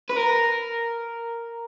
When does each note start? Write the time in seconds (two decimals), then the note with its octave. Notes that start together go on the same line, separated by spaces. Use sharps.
0.10 B4
0.17 A#4